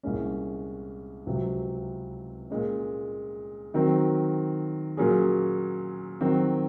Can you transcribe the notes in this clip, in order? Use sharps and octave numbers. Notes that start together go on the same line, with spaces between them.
C2 A#2 G#3 C#4
C#2 C3 F#3 C4
A#2 G#3 C#4
D#3 F#3 C4
A#2 F#3 C#4 G#4
D#3 F#3 C4 F#4